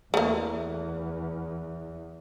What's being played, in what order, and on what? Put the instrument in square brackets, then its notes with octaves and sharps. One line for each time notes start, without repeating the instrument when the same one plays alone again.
[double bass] E2 E3 [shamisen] A3 A#3